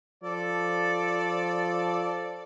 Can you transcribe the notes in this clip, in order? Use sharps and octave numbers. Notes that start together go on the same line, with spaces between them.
F3 A4 D5